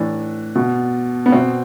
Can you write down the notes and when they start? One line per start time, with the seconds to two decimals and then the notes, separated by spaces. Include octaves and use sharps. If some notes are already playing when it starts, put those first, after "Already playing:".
Already playing: A2 E3 D4
0.55 B2
1.26 B3
1.32 B2 C4